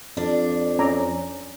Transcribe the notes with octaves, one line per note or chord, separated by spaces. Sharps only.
F2 D4
C#4 A#5 D6